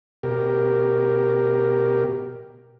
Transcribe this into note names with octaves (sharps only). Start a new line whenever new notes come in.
B2 G4 A#4